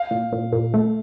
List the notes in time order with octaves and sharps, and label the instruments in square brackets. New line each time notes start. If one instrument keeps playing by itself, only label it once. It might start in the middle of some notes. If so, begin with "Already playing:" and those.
Already playing: [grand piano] F5
[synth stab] A#2
A#2
A#2
A3